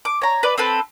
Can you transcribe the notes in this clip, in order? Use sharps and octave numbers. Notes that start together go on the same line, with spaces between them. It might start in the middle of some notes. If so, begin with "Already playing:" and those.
D6
C#5 A#5
B4 D5
C4 A4 B4